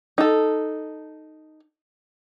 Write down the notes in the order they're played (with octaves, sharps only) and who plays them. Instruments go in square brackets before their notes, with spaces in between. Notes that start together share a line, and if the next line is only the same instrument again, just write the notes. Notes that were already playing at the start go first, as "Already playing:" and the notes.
[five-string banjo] D#4 A4